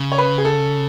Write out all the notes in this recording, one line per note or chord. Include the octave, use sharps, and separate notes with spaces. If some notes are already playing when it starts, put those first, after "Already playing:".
Already playing: C#3
C#5
B4
G#4
A4